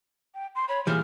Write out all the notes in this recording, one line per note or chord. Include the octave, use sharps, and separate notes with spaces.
G5
C6
C#5 B5
A#2 E3 G3 G#4 F6